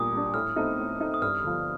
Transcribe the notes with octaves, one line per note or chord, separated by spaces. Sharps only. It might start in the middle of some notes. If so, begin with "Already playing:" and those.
Already playing: A#2 G3 D4 D#6
G3 D4
A2 F6
A3 C4 D#4
A2
A3 C4 D#4
D#6
G2 F6
D3 F3